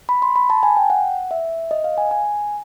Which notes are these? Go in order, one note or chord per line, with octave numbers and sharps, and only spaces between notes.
B5
C6
B5
A5
G#5
G5
F#5
E5
D#5
F5
G#5
G#5